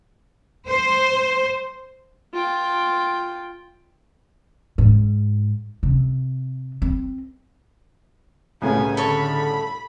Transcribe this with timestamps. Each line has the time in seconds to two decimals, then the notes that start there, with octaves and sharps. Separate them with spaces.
0.68 C5
2.34 F4 G5
4.78 G#2
5.83 C3
6.82 C4
8.62 C2 A2 C#3 B3 G#5
8.97 D3 A4 C#5 B5